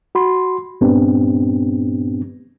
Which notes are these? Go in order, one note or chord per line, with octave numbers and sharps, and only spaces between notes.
F#4 B5 C6
G2 A#2 B3 C4 D4 G4